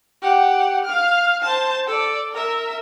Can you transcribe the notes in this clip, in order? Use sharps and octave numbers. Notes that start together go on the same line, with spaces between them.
G4 F#5
F5 F6
C5 A5
A4 D5
A#4 E5